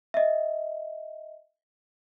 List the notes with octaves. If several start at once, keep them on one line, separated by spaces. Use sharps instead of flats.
D#5 E5